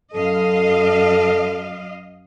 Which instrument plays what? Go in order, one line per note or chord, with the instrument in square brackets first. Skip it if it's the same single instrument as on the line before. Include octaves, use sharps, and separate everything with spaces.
[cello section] F#2 D#5 F5 [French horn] A4